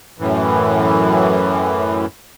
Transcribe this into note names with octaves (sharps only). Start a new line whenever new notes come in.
F#2 A2 E3